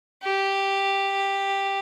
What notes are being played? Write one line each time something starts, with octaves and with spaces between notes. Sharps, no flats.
G4